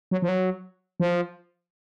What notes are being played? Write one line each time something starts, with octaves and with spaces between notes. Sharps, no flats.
F#3
F3
F#3
F3